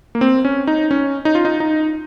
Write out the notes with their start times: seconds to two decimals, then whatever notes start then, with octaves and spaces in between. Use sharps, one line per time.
0.15 A#3
0.21 C4
0.45 C#4
0.67 D#4
0.91 C#4
1.25 D#4
1.35 F4
1.45 D#4
1.60 D#4